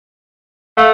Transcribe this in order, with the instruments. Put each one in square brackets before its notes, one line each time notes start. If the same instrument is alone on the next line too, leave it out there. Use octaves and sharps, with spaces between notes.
[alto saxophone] A3 [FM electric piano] F5